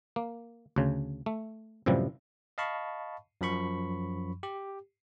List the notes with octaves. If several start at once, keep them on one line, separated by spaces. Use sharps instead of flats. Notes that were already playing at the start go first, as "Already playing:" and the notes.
A#3
D2 C#3
A3
F#2 A2 C3 E3 F3 G3
D#5 F5 A5 B5 C#6
F#2 F3 B5 C#6
G4